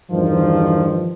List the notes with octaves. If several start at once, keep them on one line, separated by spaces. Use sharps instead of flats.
E2 G2 D#3 F3